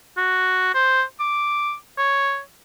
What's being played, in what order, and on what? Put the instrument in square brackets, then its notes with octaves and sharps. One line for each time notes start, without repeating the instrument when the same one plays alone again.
[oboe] F#4
C5
D6
C#5